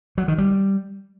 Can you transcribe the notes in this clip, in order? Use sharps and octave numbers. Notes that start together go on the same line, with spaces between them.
F#3
D#3
G3